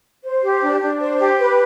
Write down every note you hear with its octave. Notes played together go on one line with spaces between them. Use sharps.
C5
G4
D4
D4
C5
G4
B4